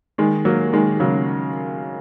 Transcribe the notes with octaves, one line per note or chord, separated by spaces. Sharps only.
D#3 G#3
F#3 A#3
D#3 G#3
C#3 F#3